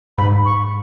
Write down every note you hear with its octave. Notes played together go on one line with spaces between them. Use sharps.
G#2 B5
C#6